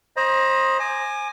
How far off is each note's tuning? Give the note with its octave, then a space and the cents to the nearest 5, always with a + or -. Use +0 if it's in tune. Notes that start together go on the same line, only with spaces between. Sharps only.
C5 +25 D#5 +0 B5 -45
G#5 +0 D6 +40